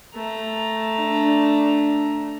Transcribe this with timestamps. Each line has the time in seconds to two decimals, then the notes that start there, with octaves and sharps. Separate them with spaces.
0.14 A3 A#5
0.99 D4